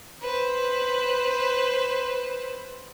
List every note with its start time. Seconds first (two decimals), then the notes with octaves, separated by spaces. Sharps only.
0.22 B4 C5